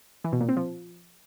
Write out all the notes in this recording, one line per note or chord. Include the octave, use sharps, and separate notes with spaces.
E3
B2
A#2
C4
F3